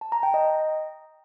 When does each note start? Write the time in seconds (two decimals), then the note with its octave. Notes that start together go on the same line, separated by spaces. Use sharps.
0.01 A5
0.12 A#5
0.23 G5
0.34 D#5